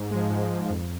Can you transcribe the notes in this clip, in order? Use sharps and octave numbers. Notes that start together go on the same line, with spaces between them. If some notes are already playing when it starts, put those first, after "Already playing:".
Already playing: G#2
F3 G#3
G#2
F3 G#3
F2